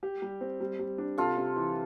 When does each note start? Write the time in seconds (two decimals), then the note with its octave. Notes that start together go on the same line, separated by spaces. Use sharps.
0.03 G4
0.22 G3
0.41 C4
0.60 G3
0.79 G3
0.98 D4
1.18 C3 F4 A4
1.37 C3
1.56 E3